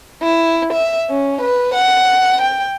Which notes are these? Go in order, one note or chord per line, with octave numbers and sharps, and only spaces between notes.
E4
E5
C#4
B4
F#5
G5